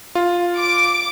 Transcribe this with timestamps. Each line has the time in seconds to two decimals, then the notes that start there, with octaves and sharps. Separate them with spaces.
0.15 F4
0.57 D6 D7